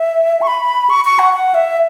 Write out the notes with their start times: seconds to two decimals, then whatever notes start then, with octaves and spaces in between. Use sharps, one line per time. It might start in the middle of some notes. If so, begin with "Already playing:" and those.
Already playing: E5
0.42 C#6
0.47 B5
0.90 C#6
1.05 C#6
1.19 F#5
1.33 F#5
1.54 E5